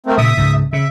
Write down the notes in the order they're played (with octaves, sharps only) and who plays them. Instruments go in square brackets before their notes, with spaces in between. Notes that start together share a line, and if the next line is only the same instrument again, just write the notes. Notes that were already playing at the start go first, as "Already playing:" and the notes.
[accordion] A3 A#3 C4
[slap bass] A#2 C#3 [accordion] E5 D#6
[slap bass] C#2 G#2
[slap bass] C#3 [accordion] E5